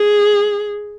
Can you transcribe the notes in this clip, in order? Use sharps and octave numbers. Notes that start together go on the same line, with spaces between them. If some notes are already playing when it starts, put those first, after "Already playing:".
Already playing: G#4